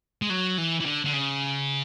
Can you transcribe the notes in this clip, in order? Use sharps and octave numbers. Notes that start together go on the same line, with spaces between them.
G#3
F#3
E3
E3
D3
D3
C#3